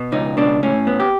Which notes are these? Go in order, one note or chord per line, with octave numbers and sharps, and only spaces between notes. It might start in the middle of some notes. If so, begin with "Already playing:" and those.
Already playing: B2
C#2 D#4
B2 D4
A2 C#4
B3
G4